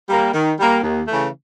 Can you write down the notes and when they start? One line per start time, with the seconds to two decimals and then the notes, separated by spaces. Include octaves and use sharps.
0.09 G3 A#3
0.33 D#3
0.59 G3 A#3
0.83 D#2
1.08 C#3 E3 A3